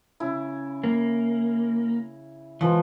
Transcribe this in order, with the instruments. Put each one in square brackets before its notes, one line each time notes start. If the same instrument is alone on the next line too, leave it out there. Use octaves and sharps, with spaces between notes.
[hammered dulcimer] C#3 E4
[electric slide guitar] A#3
[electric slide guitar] E3 [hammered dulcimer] F3 G#3 B4